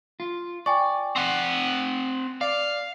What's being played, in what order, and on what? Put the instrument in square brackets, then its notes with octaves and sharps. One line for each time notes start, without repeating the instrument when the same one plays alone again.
[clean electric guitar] F4
[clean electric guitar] D5 [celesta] G5 G#5 C#6
[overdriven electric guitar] C4 F#5
[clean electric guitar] D5 [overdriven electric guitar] F5